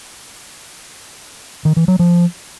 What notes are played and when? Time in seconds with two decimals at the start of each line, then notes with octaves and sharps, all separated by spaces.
1.65 D#3
1.76 E3
1.88 F#3
1.99 F3